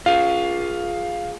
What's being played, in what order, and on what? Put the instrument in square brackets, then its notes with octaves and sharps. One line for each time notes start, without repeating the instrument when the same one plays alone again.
[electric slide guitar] F4 G#4 [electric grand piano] F5